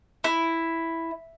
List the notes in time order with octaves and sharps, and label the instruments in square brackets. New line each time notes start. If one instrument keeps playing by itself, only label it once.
[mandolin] E4